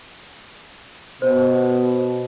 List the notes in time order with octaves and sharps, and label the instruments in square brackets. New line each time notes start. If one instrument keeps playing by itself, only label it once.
[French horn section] B2 [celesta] C5